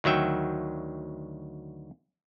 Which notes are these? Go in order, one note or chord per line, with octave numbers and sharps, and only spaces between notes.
D2 D#3 F#3 E5 G5